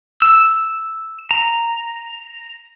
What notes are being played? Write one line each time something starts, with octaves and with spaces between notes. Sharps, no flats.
E6
A#5